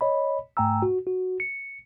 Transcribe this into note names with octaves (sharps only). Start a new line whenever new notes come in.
C#5 D#5 B5
G#2 A3 G5 G#5 A#5 E6
F#4
F#4
C#7